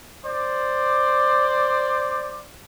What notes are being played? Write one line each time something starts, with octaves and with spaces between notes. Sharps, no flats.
C5 D5